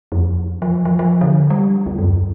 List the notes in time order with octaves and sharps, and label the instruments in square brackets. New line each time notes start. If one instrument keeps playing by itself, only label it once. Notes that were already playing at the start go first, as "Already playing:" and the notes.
[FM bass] F2
F3
F3
F3
D3
G3
D2
F#2